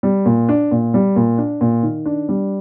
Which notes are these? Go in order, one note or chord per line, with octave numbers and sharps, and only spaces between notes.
G3
A#2
D4
A#2
G3
A#2
D4
A#2
D#3
D4
G3